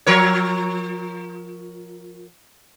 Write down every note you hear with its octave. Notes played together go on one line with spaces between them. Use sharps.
F3 A#4 C#5